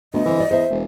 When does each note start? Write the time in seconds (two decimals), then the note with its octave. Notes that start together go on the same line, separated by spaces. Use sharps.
0.14 D2 B3 D#5
0.25 D3 E3 C4 B4
0.38 F#4 D5
0.51 E2 C5 E5
0.70 E1